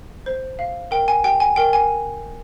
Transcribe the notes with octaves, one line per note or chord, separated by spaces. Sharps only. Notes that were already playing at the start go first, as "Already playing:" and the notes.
C5
F5
A#4 G5
G#5
G4 G5
G#5
A#4 G5
G#5